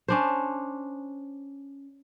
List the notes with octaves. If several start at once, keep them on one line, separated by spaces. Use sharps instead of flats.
C#4 D4 C5